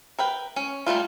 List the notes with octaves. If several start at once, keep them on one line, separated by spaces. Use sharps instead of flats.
A#4 B4 G5
C#4
G3 A3 A#3 F4